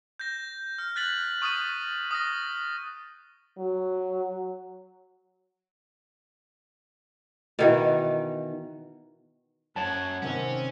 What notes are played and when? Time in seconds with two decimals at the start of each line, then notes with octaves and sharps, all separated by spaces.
0.20 G6 A#6
0.78 F6
0.96 F#6 A6 B6 F#7
1.42 C#6 D#6 F6 A6 D#7
2.11 D#6 F6 A#6
3.58 F#3
7.59 B2 D#3 E3
9.76 F#2 C#5 F#5 A5
10.22 C3 D#3 C4 C#4